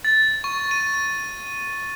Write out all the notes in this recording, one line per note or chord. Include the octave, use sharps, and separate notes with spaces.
A6
C#6
D#7